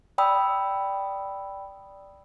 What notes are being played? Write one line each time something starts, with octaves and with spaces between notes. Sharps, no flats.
D5 G5 B5 D#6 E6